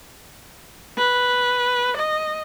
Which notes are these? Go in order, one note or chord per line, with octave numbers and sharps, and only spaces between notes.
B4
D#5